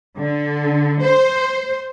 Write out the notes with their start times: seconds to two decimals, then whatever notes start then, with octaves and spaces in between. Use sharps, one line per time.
0.19 D3
1.02 C5